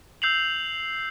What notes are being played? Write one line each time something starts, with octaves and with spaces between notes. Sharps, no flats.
E6 G6 C7 F7 F#7